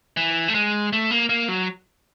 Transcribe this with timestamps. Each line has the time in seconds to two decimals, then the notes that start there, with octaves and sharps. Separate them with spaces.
0.17 E3
0.48 A3
0.55 G#3
0.93 A3
1.11 A#3
1.29 A#3
1.48 F#3